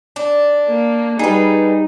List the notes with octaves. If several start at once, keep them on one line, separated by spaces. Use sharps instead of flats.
D4
A#3
G3 D#4 G#4 B4